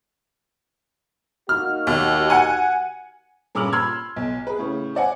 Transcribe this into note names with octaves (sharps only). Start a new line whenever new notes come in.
A#3 D#4 F#4 F6
D#2
F#5 G#5
G2 A#2 C#3 D6 F6 F#7
B5 C6 E6 F6 G#6
B1
G#4 B4
A2 C#3
C5 D5 F#5 G#5